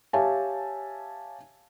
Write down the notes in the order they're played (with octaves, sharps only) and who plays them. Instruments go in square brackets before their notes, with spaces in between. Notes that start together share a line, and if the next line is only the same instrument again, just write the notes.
[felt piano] G4 C#5 E5 F5 G#5 A5